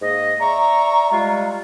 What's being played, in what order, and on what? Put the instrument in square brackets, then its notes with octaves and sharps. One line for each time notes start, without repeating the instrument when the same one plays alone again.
[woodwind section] G#2 A#3 D#5
[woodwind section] D5 E5 C#6 [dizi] A#5
[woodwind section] G3 G#3 F4